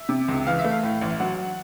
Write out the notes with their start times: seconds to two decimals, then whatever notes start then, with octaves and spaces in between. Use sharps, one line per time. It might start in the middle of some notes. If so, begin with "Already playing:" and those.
Already playing: E5
0.09 C3
0.28 C#2
0.46 E3 F5
0.59 E5
0.64 A3
0.71 F5
0.83 A2
1.02 A1
1.20 F#3 F#5